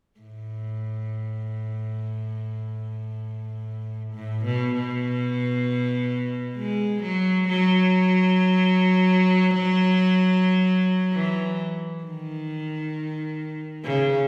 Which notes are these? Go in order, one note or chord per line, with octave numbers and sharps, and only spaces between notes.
A2
A2
B2
B2
G#3
F#3
F#3
E3
D#3
C#3